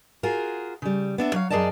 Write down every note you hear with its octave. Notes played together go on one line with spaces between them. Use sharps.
F4 F#4 G#4 A#4
C#3 G3
B3 D4 E5
F#3 C#5 F5
F#2 G#4 A#4 D5 D#5 A5